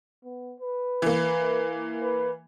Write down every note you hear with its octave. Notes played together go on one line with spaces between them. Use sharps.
B3
B4
E3 A#3
B4